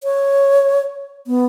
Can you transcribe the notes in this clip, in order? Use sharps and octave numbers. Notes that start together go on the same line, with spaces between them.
C#5
B3